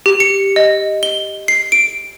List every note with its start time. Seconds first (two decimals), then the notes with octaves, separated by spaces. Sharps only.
0.06 G4
0.20 C#7
0.56 D#5
1.03 G7
1.48 C7
1.72 D7